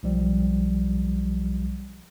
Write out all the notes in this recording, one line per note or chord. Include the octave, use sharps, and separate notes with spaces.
B1 F3 G3